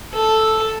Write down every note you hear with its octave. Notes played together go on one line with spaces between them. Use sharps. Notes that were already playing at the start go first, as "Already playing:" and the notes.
A4